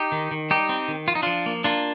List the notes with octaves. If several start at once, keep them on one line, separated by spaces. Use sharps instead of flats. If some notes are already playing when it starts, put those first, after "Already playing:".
Already playing: D#4 G4
D#3
D#3
G3 D#4 G4
C4
D#3
F3 F4
D#4
F3 D4 F4
A#3
A#3 D4 F4